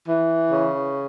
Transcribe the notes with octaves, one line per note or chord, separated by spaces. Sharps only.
E3
C#3